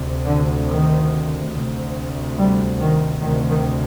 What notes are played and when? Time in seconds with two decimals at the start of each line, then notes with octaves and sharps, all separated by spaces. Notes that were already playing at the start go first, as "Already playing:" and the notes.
Already playing: D2 C3
0.26 D3
0.68 D#3
1.53 D2 C3
2.38 G3
2.80 D#3
3.22 D2 C3 D#3
3.51 D#3